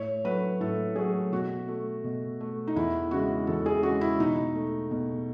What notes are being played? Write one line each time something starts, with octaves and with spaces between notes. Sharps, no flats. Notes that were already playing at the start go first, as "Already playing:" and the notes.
Already playing: A2 C#5
F#3 A3 B4
A2 A4
F#3 A3 G#4
B2 F#4
A3
B2
A3
D#4
E2 E4
C#3 E3 G#3 F#4
E2 A4
G#4
C#3 E3 G#3 F#4
E4
B2 D#4
A3
B2